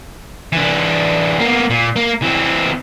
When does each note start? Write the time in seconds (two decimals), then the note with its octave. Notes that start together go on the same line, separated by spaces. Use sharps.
0.53 E3 D4
1.40 A#3 B3
1.70 A#2
1.96 A#3
2.22 E3 C4